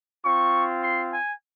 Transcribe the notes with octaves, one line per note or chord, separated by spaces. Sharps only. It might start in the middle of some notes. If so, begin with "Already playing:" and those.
C4 F4 C#6
C6
G#5